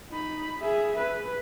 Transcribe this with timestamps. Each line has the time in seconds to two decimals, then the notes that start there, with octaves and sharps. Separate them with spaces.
0.11 D#4 B5
0.59 G#4 E5
0.98 B4